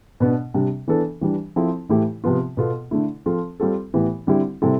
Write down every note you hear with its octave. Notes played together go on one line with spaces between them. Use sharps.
B2 B3 D4
C3 G3 D4
E3 B3 D4 A4
E3 G3 D4
F3 C4 E4 A4
A2 E3 A3 E4 G4
C3 F3 B3 F4
B2 B3 F4 A4
D3 A3 E4
F3 C4 F4 A4
G3 C4 F4 A4
A2 E3 B3 E4 G4
D3 G3 C4 E4 G4
C3 G3 C4 E4 A4